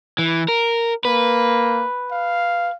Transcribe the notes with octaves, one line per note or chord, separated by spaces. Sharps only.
E3
A#4
A#3 B4
F5